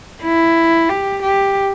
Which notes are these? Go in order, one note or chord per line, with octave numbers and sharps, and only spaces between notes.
E4
G4
G4